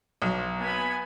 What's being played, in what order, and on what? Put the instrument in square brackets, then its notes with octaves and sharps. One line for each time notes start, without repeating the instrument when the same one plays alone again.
[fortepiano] B1
[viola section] B3 G#5 B5